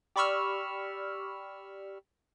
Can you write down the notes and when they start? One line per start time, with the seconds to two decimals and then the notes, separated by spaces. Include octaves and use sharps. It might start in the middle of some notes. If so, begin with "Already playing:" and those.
0.16 G4 D5 B5 C#6 E6 F6